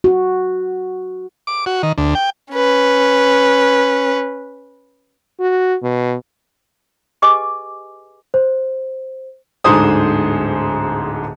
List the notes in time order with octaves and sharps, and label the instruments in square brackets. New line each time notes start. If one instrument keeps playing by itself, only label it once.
[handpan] F#4
[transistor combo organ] D6
F#4
D#3
D2
G5
[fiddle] C#4 B4
[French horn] F#4
B2
[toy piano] G4 G#4 B4 D#5 G#5 D6
[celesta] C5
[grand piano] D1 G#2 D3 G#4 C5 D#6